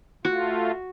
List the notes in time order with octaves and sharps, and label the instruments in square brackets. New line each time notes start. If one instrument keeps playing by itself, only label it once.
[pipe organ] A3 F4 [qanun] F#4